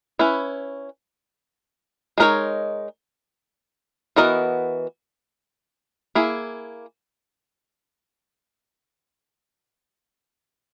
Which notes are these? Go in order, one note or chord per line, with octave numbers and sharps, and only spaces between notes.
C#4 E4 B4
G#3 D#4 A#4 C#5
E3 B3 F#4 A#4 D#5
A#3 E4 G#4